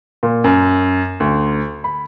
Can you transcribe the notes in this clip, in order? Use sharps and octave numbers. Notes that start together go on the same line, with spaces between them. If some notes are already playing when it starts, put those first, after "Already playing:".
A#2
F#2
D2
B5